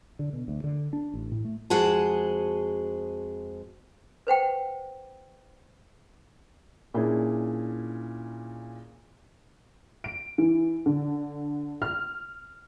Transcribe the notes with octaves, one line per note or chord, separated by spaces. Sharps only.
D3
B2
D2
D3
D4
A1
A2
A3
F2 G#3 F#4 G#4 C5 A5
B4 C5 F#5 G5
A#2 A#3 C#4 D4 E4 G#4
D7
E3
D3
F6